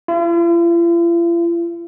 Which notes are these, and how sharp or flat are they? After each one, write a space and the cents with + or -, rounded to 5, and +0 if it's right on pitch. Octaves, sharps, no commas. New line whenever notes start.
F4 -45